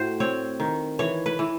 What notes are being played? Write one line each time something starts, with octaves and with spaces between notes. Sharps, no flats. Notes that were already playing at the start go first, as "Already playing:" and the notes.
Already playing: A2 F#4 C5
C4 C#5
D#3
E3 C#5
B4
E3